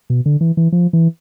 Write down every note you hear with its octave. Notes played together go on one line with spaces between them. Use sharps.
B2
D3
E3
E3
F3
E3